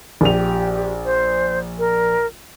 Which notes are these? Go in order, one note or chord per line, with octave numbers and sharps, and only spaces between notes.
A#1 G4 F7
C5
A#4